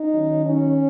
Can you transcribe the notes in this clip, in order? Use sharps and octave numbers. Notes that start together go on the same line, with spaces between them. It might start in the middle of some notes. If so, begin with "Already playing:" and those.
Already playing: D#4
D#3 F#3 C#4
C#4